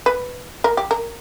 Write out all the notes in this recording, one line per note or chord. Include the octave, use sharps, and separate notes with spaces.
B4
A#4
G4
A#4